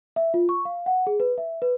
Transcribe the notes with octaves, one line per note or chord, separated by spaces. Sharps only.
E5
F4
C#6
F5
F#5
G#4
B4
E5
B4